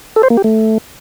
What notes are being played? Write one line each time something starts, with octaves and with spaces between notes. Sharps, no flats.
A4
C5
A#3
G4
A3